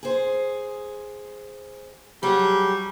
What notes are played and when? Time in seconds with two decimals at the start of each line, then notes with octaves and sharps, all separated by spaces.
0.03 G#4 C5
2.23 F#3 G3 G#4